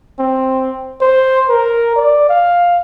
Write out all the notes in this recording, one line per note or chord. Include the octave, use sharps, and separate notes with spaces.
C4
C5
A#4
D5
F5